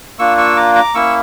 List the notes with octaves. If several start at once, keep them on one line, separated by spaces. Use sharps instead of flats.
A#3 D4 F4 C#6 E6
C#6 E6
A#5 D6
A#5 D6
A#3 C#4 E4 C#6 E6